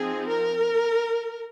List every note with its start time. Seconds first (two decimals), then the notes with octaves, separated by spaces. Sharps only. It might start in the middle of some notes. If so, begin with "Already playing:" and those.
Already playing: F3 C4 D#4 G#4
0.27 A#4